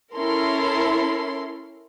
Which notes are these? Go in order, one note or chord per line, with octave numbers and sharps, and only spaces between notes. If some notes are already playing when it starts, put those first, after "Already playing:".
C#4 E4 A4 A#4 C6